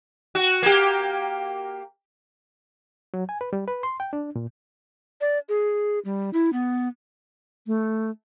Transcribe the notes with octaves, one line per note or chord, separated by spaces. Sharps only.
F#4
A#3 G4
F#3
G#5
B4
G3
B4
C6
G5
D4
A#2
D5
G#4
G3
E4
B3
A3